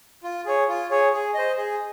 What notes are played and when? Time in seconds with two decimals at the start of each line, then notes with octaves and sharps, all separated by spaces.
0.24 F4
0.46 G#4 C#5
0.69 F4
0.90 G#4 C#5
1.13 G#4
1.34 C5 D#5
1.57 G#4